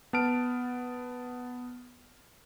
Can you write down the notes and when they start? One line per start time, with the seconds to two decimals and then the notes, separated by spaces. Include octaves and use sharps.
0.13 B3 A5 F6 D7